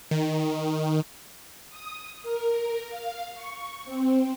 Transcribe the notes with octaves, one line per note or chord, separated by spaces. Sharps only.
D#3
D#6
A#4
F5
C#6
C4